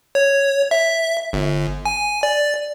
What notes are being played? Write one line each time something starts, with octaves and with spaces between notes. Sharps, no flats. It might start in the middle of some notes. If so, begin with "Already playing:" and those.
C#5
E5
G1
G#5
D5